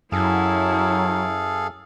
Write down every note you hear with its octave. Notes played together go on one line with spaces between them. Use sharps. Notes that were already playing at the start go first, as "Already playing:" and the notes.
F#2 F#3 E4 G#4 A4 F5